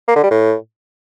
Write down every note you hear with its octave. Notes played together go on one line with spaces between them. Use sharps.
A#3
D3
G3
A2